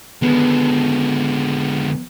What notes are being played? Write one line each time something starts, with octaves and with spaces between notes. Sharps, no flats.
D3 D#3 G#3 B3 B4